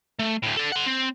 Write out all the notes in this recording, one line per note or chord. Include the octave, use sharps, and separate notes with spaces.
A3
D2 A2
A4 D5
F#5 C6
C4